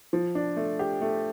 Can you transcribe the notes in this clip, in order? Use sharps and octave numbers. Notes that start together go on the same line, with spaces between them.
F3
D4
A3
G4
A3